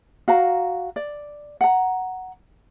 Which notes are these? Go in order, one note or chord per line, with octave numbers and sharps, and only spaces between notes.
F#4 F5 A#5
D5
F#5 A#5